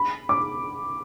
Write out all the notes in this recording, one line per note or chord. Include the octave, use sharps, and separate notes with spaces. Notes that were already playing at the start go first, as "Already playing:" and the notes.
Already playing: B5
D6